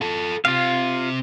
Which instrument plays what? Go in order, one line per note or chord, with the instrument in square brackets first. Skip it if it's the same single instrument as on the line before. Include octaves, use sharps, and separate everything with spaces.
[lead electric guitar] F4 A4
[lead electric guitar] C4 G4 [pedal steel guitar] F4 F5